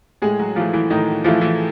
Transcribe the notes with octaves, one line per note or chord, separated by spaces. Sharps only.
A2 G#3 G#4
F#3 F#4
E3 F3 A3 F4
E3 E4
A2 D#3 D#4
E3 F3 A3 F4
E3 E4